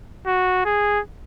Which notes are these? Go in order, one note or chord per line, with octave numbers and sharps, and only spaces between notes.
F#4
G#4